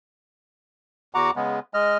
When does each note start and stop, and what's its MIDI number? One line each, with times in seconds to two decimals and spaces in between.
1.15 1.31 40
1.15 1.31 66
1.15 1.31 78
1.15 1.31 82
1.15 1.31 86
1.36 1.59 49
1.36 1.59 56
1.36 1.59 59
1.74 1.98 56
1.74 1.98 75
1.74 1.98 89